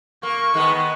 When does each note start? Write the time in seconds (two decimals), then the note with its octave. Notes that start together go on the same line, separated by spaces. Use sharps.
0.23 A#3 C#6
0.54 D#3 G#3 B3